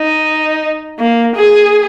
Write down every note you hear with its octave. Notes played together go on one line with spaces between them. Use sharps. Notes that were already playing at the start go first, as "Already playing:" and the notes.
Already playing: D#4
A#3
G#4